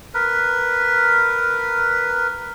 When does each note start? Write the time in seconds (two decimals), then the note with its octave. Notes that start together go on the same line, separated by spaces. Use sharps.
0.14 A#4 B4